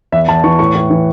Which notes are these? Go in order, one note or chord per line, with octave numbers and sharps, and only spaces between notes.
E2 E5
E2 A5
E3 C#6
A2 C#6
A2
E3